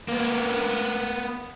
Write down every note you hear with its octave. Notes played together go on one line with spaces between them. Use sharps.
A#3 B3